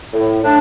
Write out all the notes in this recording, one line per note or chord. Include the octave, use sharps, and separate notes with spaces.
A2
A2 D4